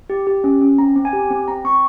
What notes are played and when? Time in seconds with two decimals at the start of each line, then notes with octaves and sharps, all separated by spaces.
0.10 G4
0.27 G4
0.44 C#4
0.61 C#4
0.78 C4 A#5
0.96 C4
1.05 G#5
1.13 G4
1.31 C4
1.48 C4 A#5
1.65 C4 C#6